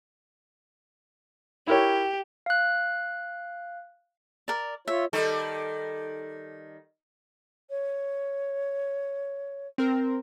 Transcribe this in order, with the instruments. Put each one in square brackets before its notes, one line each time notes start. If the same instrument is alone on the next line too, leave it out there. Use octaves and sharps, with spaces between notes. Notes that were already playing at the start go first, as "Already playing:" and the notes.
[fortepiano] E4 A#4 C#5 [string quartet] G4
[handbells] F5 F#6
[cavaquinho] A#4 D5
[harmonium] F4 C#5 [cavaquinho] E5
[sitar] D#3 G3 A4
[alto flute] C#5
[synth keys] C4 A#4